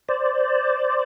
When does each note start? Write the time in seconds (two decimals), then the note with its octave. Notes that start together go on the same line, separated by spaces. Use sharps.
0.09 C5 D5